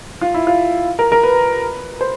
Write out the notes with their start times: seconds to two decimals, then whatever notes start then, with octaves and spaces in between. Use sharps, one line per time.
0.21 F4
0.34 E4
0.47 F4
0.99 A#4
1.12 A#4
1.23 B4
2.01 C5